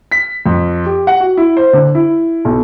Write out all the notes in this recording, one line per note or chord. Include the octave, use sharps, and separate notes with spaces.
B6
F2
G4
F#5
F#4
E4
C5
D3
E4
B1